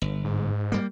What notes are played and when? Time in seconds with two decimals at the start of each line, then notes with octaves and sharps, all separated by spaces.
0.02 G1
0.24 G#2
0.72 G3 A#3